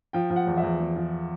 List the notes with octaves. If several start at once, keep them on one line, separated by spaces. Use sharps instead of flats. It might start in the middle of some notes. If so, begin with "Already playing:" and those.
F3 G5
F3
F#5
E2
E5
E2
E2
F3